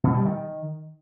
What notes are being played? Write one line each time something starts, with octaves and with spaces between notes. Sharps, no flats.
B2
G3
D#3